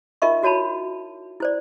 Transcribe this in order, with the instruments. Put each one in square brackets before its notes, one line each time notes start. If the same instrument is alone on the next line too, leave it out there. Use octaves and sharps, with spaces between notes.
[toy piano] D#4 F4 A#4 D#5 E5 C#6
E4 F#4 C#5 A5 B5
E4 C5 D5